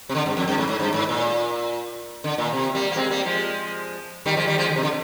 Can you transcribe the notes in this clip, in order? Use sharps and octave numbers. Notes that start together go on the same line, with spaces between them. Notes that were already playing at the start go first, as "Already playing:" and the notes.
C3
D3
G2
F2
G2
G#2
G#2
G2
G#2
A#2
D3
A#2
C3
G3 A#3
A#3
G#3 C4
G3 A#3
F3 G#3
D#3 G3
F3 G#3
D#3 G3
F3 G#3
D3
C3
D3